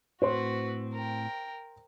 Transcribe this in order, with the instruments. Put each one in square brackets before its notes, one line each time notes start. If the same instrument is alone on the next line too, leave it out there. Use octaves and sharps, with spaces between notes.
[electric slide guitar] A2 C4 [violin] F#4 B4 [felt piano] C5 C6
[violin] A#4 G5